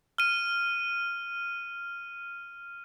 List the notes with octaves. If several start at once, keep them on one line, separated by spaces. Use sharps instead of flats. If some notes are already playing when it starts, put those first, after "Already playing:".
F6 D#7